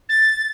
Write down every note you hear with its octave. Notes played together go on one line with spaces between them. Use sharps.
A6